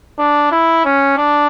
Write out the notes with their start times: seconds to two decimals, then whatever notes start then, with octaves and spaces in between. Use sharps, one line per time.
0.19 D4
0.51 E4
0.85 C#4
1.18 D4